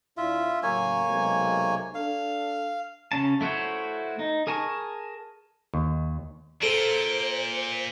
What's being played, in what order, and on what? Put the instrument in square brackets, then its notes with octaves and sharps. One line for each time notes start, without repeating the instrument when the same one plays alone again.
[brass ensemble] D#2 D4 E4 [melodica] F4 E5
[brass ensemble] A2 C#3 F#3 [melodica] A#3 C#5 G#5
[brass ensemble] B1 C3 G#3
[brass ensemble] D4 A4 [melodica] F5
[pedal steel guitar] C#3 C#4 A5
A3 E4 F#4 C5 C#5
D#4
G#4 A#4 G#5 A5 C#6
[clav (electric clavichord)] D#2
[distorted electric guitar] A#2 [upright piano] A4 [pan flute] C5 [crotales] D7 F#7 G7